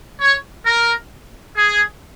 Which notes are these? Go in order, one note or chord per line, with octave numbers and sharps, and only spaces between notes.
C#5
A#4
G#4